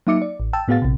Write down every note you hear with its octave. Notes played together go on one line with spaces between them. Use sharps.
F#3 A#3 D#4 E5 D6 C#7
D5
A1
G5 A5 E6
A2 B3 F#4 G#4 F5 A6
A#1 C3